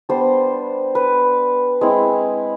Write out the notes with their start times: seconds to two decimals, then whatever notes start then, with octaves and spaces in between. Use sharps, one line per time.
0.09 G3 B3 D4 C5
0.95 B4
1.81 G#3 C4 E4